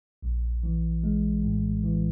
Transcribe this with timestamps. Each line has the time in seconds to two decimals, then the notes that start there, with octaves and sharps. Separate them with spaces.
0.23 A#1
0.63 E3
1.03 G#3
1.43 A2
1.83 E3